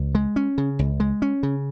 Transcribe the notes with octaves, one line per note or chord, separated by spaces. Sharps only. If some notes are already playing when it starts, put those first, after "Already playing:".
Already playing: C#2
G#3
C#4
C#3
C#2
G#3
C#4
C#3